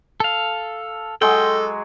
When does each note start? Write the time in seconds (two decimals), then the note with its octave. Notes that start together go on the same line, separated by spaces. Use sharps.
0.20 A4 F5
1.22 F#3 G#3 G#4 A4 G5